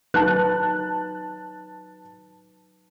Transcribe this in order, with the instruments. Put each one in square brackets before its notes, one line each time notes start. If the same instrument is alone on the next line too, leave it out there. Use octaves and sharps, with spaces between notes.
[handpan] F#3 D#4 B4 [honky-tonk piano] A5 F#6